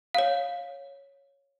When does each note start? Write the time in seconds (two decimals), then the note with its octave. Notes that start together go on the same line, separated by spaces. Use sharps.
0.15 C#5 F5